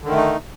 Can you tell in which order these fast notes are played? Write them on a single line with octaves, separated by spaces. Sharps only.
D3 D#3 A3 D#4